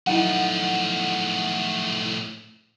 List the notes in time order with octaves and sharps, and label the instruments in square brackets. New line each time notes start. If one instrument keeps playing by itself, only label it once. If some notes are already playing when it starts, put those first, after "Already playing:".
[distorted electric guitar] A2 F3 [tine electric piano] F#3 D#4 E4 [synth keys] F#5